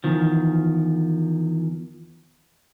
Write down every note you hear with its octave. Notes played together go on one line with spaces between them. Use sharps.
E2 D#3 F3